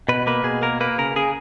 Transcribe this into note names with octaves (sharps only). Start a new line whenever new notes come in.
B2 B4
A#3 B4
B2 G#4
A#3 A#4
A#3 B4
C#3 A#4
C#3 G#4